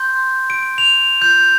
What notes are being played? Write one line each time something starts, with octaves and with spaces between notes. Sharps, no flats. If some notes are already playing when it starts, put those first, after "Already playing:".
Already playing: C6 G6
D7
F7
G6